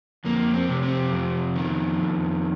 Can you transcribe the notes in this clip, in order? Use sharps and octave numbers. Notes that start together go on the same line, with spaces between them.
F2 A#3
C4
C3
C4
F2
D#3
F2